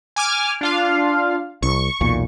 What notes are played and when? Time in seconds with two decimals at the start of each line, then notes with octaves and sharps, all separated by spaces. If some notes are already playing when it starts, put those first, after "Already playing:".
0.16 G#5 D6 F6
0.61 D4 F4 F5
1.62 C2 C#6
2.01 B1 E2 A#2